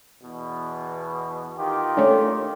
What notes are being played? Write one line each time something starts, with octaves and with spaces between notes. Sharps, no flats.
E2 B2
D#3 F4 G4
A3 C#4 D4